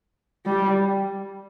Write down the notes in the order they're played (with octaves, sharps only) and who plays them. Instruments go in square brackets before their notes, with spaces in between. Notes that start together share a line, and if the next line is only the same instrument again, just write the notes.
[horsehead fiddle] G3